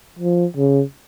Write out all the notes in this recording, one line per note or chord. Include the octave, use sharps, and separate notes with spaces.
F3
C#3